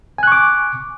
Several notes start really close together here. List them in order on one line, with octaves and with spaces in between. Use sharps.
G#5 F#6 C#6 D6